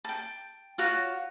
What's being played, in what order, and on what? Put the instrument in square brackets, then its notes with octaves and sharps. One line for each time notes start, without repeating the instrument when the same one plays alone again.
[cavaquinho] G5 A5
F4 F#4 C#5